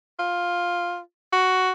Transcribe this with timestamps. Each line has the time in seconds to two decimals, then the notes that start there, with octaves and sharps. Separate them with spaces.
0.19 F4
1.33 F#4